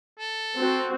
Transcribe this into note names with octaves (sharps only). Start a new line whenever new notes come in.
A4
C4 F#4